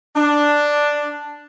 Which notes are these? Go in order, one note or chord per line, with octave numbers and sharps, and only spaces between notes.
D4